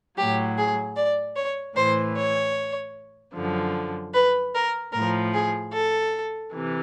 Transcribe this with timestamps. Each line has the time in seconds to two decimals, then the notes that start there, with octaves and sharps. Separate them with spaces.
0.17 A2 F#3 G4
0.57 G#4
0.96 D5
1.35 C#5
1.76 A2 E3 C5
2.16 C#5
3.34 F#2 D3 F3
4.14 B4
4.54 A#4
4.93 A2 A#4
4.98 F3
5.33 G#4
5.73 A4
6.52 C3 E3